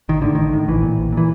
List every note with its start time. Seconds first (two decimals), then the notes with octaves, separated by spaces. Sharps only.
0.09 A1 D#3
0.22 A2 D3
0.35 A1 D#3
0.53 A2
0.68 A#1 E3
0.83 A#2
0.98 A#1
1.13 A#2 E3